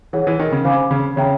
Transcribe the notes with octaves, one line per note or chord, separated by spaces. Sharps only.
E3 G#4 C#5 F#5
E3
D#3
C#3
C#3 C5 F5 G#5 B5 D6
C#3
C#3 C#5 E5 G5 A#5